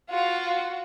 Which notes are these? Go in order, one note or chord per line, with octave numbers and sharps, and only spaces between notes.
F4 F#4